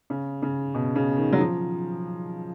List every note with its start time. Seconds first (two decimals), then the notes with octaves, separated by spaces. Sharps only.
0.10 C#3
0.42 C#3
0.74 B2
0.95 C#3
1.17 D#3
1.33 F#3
1.38 F3